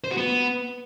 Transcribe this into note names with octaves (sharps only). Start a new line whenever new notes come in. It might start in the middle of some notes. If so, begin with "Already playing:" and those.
C5
F#4
B3